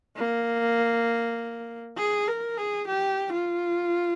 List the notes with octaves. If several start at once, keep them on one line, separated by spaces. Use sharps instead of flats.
A#3
G#4
A#4
G#4
G4
F4